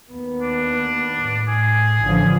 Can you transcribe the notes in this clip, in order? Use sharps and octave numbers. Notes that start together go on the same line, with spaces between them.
D#2 B3
D4
A2
G#4
A1 D3 F3